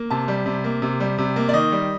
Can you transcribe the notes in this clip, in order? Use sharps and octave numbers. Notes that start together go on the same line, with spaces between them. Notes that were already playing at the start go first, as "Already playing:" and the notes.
Already playing: A#3
C3 A5
G3
C3
A#3
C3
G3
C3
A#3
D5
D#3 D#5
G3